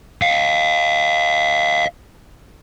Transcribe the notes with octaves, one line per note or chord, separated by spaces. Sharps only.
D#5 F5